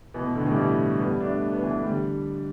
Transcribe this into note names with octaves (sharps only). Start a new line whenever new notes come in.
B2 E3
B2
A2 D3
B2 E3
G3
E3 A3
G3 B3
A3 D4
B3
E3 A3
D3 G3